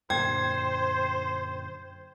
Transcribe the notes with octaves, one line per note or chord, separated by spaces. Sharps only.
F#2 A#2 D3 C5 G5 G#6